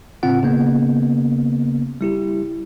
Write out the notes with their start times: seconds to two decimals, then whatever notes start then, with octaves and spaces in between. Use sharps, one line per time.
0.23 A2 C#3 C4 F4 F#5
0.43 C#3 A#3 B3
2.01 G3 E4 G4